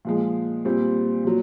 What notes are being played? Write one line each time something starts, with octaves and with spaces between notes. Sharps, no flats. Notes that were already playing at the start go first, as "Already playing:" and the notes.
A#2 F3 G#3
A#2 G3 C4
A#2 F#3